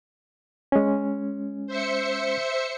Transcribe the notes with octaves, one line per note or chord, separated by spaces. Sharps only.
G#3 C#4
C5 E5 C#7